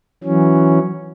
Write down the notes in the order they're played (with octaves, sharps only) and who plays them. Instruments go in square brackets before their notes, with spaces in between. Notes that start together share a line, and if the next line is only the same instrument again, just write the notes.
[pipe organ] E3 F#3 C#4